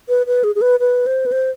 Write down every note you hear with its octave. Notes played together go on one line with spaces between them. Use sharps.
B4
B4
G#4
G#4
B4
B4
C5
B4
C5